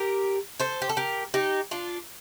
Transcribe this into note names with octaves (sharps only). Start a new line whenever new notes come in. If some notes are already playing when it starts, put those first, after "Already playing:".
Already playing: G4 A#4
A4 C5
G4
A4
G4 A#4
D#4 G4
D4 F4